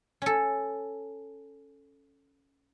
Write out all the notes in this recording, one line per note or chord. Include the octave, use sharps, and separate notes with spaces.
C#4 A4